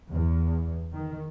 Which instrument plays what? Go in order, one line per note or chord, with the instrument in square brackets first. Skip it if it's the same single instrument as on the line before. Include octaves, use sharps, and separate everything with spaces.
[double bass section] E2
D#3